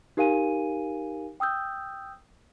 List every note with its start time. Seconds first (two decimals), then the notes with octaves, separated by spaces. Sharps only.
0.17 D#4 G4 A#4 F5 G#5 D#7
1.40 G5 D#6 E6 G6